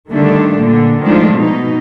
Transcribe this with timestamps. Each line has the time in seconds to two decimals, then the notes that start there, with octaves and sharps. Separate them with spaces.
0.12 D3 D#3 G3 A3 D4
0.56 A#2 D3
1.04 D#3 F3 G#3 A3 D4 D#4
1.35 B2 D#4